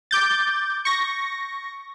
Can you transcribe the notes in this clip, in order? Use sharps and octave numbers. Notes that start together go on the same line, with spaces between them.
D6 G6 A6
C#6 A#6